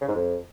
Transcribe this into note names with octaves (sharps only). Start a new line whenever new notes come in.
C#3
G#2
F2